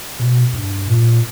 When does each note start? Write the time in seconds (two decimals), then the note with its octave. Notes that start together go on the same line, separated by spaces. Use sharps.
0.19 B2
0.54 G2
0.87 A#2